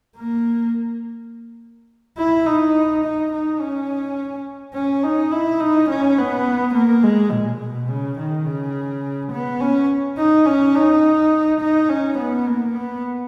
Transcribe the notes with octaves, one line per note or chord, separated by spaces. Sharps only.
A#3
E4
D#4
D#4
D#4
C#4
C#4
D#4
E4
D#4
C#4
B3
A#3
G#3
A#2
B2
C#3
D#3
C#3
B3
C#4
D#4
C#4
D#4
D#4
C#4
B3
A#3
B3